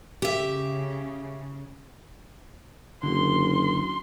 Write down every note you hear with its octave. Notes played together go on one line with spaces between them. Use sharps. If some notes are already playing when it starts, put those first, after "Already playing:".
C#3 G4 E5
F#1 D3 C6